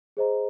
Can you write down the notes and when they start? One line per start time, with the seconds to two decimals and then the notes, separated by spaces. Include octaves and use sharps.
0.17 G#4 C5 D#5 A#5